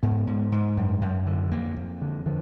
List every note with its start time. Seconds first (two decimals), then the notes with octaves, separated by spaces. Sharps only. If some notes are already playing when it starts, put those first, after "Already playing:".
0.03 G#2 B3
0.27 G#2
0.52 G#2
0.77 F#2
1.01 F#2
1.26 D3
1.51 F2 A#3
1.76 F2
2.01 D3
2.26 D3 F3